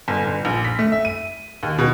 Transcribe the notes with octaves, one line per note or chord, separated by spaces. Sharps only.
G1
G1
A#1
B6
A3
E5
D#7
D#2
B2